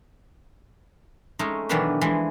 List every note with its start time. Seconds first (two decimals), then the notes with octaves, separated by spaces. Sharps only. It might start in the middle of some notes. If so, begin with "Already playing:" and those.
1.39 G#3 A3 C#4 D#4
1.69 B2 D#3 E3 F#3 D4 G4
2.01 E3 F3 G#3